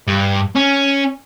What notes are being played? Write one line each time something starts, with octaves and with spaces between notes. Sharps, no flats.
G2
C#4